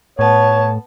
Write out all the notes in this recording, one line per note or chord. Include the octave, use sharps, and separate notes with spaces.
A2 B3 C#5 A5